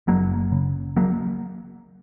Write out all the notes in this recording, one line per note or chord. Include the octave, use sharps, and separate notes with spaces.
F#1 F#3 A#3
C#3
F#3 A#3